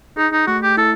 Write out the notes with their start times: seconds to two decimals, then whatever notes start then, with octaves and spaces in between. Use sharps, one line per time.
0.17 D#4 G#4
0.33 D#4
0.47 A3 F#4
0.63 G4
0.77 E4 A4